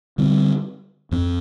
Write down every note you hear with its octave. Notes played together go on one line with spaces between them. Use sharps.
D3 G3 C4
F2 F3 C4